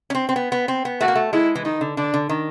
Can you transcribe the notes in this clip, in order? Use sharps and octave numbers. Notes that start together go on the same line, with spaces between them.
C#4
C4
C4
B3
B3
C4
B3
A3 F#4
A#3
A3
G#3 E4
E3
D#3 D#4
D3
D3 D4
D3
D#3